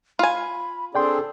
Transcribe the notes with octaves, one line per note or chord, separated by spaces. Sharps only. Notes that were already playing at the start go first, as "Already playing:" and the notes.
F4 G#5 B5
C4 D4 G#4 A4 D5 G5 C6